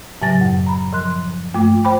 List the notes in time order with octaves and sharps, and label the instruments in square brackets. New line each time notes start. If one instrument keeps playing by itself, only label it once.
[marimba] A2 C#3 F#3 G#5 A6 A#6
F#2
A#5 B5
F3 A#4 C6 F#6
G2 A3 A#3 F4 D6
C5 G5 B5 D6